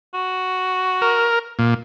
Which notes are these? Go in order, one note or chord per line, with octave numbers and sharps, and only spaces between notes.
F#4
A#4
A#2